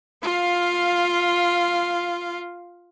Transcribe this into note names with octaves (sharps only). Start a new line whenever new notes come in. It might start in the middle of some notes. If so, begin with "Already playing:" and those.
F4 F5